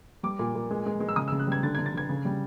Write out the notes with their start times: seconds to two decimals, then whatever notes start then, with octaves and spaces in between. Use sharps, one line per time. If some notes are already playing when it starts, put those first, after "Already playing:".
0.23 G3 D6
0.39 A#2
0.55 A#2
0.71 G#3
0.86 G#3
1.00 G#3
1.09 E6
1.16 C#3 D#6
1.28 E6
1.32 C#3
1.40 F#6
1.47 G3 G#6
1.63 D3 A6
1.75 G#6
1.79 D3
1.86 A6
1.94 D3 G#6
2.09 C#3
2.25 G3